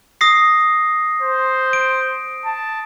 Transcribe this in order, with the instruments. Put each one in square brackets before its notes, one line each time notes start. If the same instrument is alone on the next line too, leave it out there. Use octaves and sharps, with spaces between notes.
[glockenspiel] D#6 A#6 C7
[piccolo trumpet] C5
[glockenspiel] D7
[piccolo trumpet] A5